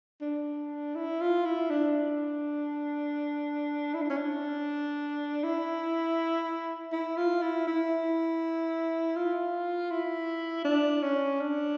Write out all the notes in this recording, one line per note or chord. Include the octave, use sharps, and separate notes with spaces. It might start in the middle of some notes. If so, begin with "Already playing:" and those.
D4
E4
F4
E4
D4
E4
D4
C#4
D4
E4
E4
F4
E4
E4
F4
E4
D4
C#4
D4